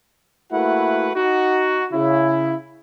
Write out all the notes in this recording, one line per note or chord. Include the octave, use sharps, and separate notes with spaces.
A3 A#3 E4 F#4 B4 F#5
D#4 F#4
C#3 E4